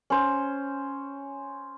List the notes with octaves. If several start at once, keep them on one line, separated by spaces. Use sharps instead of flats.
C#4 C5